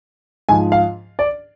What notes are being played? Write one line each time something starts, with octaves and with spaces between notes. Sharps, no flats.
G#2 F3 G#5
F5
D5